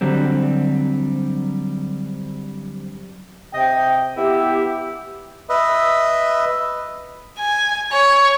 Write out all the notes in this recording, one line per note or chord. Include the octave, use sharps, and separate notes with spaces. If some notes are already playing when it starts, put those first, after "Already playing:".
D3 F#3 G3 C4
C3 D#5 G5
B3 E4 G4
B4 D#5 E5
G#5
C#5